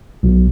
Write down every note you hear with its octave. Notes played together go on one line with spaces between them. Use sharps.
B1